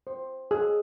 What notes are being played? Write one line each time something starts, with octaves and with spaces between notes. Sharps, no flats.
C5
G#4